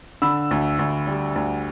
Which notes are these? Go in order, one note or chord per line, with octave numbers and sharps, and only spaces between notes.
D3 B5 E6
D2
D2
G3
D2